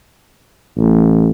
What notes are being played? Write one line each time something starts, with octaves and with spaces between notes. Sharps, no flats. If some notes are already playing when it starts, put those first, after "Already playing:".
A1